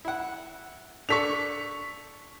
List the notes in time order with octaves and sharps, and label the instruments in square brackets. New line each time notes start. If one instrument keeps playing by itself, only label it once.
[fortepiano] E4 F#5
[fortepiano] D4 A4 [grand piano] C#6 B6 F7